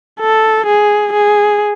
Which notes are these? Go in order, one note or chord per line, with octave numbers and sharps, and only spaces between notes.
A4
G#4
G#4